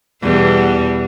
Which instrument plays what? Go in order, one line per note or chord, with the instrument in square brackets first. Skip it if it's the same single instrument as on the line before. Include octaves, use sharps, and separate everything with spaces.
[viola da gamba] E2 B2 G3